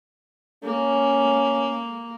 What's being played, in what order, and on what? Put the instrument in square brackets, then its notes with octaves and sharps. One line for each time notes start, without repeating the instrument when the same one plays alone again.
[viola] A#3 [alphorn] C#4